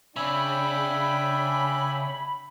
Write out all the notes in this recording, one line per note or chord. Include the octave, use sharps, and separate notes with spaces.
C#3 D4 E5 G5 G#5 B5